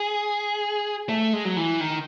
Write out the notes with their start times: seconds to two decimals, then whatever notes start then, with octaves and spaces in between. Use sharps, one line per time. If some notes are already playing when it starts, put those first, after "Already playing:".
Already playing: G#4
1.09 A3
1.33 G#3
1.45 F#3
1.57 E3
1.81 D#3